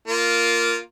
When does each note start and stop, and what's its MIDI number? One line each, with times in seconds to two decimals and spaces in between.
0.08 0.78 58
0.08 0.78 65